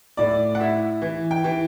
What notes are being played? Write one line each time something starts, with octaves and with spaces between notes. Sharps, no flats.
A2 D5
F#5
E4 E5
E3
G5
E3